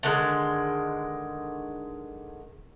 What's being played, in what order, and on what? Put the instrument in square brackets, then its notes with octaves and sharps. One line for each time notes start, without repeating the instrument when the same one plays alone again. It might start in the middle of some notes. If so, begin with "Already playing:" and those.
[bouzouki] D3 D#3 G#3